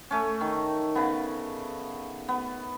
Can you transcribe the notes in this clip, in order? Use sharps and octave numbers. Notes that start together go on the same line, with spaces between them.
A3 C#4
D#3
C#3 B3
B3